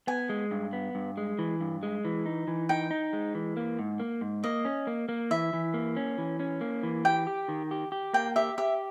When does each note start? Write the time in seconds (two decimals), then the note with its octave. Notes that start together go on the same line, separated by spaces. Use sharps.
0.07 B3 G#5
0.29 G#3
0.51 G2
0.73 B3
0.95 G2
1.17 G#3
1.39 E3
1.61 G2
1.83 G#3
2.05 E3
2.26 D#4
2.48 E3
2.69 D#4 G5
2.91 D#4
3.13 G#3
3.35 E3
3.57 A#3
3.79 G#2
4.00 A#3
4.21 G#2
4.44 A#3 D#5
4.65 C#4
4.87 A#3
5.09 A#3
5.31 E3 E5
5.53 E3
5.74 A#3
5.96 C#4
6.18 E3
6.40 C#4
6.61 A#3
6.83 E3
7.05 G4 G5
7.27 G4
7.48 D#3
7.71 G4
7.92 G4
8.14 A#3 G5
8.36 G4 E5
8.58 G4 E5